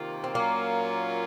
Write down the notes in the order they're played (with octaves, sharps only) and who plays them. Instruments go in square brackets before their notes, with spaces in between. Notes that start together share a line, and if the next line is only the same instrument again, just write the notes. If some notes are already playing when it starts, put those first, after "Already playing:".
Already playing: [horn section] C3 D#3 A#3 F4
[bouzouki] C4
[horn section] A#2 F#3 C#4 F4 [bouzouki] A#3